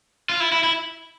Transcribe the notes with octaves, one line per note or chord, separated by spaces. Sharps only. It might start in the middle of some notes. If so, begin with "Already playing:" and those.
F4
E4
E4
E4